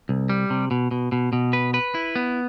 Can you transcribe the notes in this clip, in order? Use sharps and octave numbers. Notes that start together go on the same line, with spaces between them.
C2
G3
C3
B2
B2
B2
B2
B4
B4
E4
B3